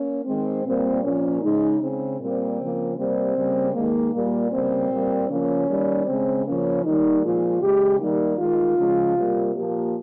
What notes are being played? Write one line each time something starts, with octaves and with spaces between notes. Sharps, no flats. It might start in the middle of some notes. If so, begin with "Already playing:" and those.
Already playing: A#3 C#4
D#3 G#3 C4
A#2 G3 A#3 C4
A#2 F3 A#3 C#4
C#3 G#3 D#4
C#3 G#3 C4
A#2 G3 A#3 C4
C#3 F3 A#3
C3 G3 A#3 C4
C#3 G3 A#3
D#3 G#3 A#3
A#2 G3 A#3
C#3 G3 A#3 C4
A#2 G3 A#3
C#3 F3 A#3 C#4
D#3 G3 A#3
C#3 G#3 C4
C#3 F3 A#3 C#4
D#3 G3 A#3 D#4
A#2 F3 G#3 F4
C#3 G#3 G4
D#3 G3 A#3 D#4
D#3 G#3 F4
C#3 F3 G#3
C3 G3 A#3
A#2 F3 A#3 G4